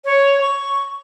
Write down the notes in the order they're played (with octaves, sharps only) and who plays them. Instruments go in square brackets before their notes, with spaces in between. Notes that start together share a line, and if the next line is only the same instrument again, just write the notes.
[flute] C#5
C#6